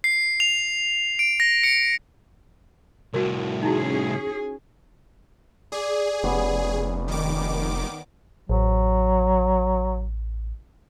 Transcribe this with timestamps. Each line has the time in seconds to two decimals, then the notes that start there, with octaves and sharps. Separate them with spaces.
0.04 C7
0.40 F7
1.19 D7
1.40 A#6
1.64 C#7
3.14 C2 A2 F#4 A#4
3.63 C#4 D#4 E4 F#4 G#4
5.72 G#4 D5
6.23 F1 G3 B3 C#4
7.08 D#3 D6
8.49 A1 F#3